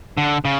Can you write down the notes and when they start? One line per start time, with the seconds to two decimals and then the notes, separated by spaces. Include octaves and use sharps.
0.17 D3
0.45 C#3